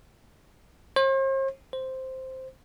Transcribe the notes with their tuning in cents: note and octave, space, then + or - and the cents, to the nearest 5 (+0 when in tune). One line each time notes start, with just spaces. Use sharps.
C5 +45
C5 +0